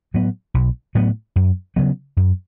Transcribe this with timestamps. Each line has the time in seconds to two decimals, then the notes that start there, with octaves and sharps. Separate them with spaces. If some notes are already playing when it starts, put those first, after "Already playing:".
0.14 A2 F#3 B3
0.54 B1
0.95 A2 F#3 B3
1.36 F#2
1.76 C#3 F#3 B3
2.17 F#2